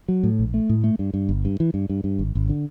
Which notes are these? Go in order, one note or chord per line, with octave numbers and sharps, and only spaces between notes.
F#3
A2
A#1
A3
A2
A3
G2
G2
G1
G2
E3
G2
G2
G2
G#1
G#1
D3